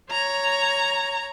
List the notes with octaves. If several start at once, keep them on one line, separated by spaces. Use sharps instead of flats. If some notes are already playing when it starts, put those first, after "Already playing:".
C#5 A#5